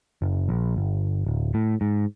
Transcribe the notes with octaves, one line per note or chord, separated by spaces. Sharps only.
F#1
A#1
G1
D1
A2
G#2